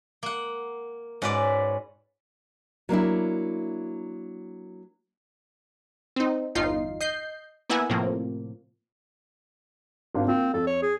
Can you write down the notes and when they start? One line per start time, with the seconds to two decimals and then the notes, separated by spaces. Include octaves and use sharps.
0.23 A#3 F#5
1.22 G#2 C#4 F#4 B4 D5
2.89 F#3 A#3 D4 E4
6.16 C4 D#4
6.55 G1 E2 D#4 F4 C7
7.01 D#5 G6 C7
7.70 A#3 B3 E4 E5 F#5 G#5
7.90 A2 C3 F3 A#3
10.15 G#1 D4 F5
10.28 A#3 C4 F4
10.54 F2 A4
10.67 C#5
10.82 G#4